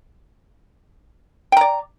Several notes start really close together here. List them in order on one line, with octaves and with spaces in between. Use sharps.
G5 A#5 D5